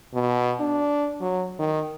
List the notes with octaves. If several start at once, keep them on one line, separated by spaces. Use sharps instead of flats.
B2
D4
F#3
D#3